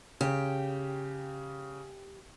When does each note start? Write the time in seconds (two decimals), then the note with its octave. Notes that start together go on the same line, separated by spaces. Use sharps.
0.21 C#3 G4